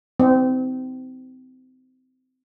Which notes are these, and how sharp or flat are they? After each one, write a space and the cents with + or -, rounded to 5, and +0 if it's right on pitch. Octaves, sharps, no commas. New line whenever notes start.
C4 -25 D#4 +40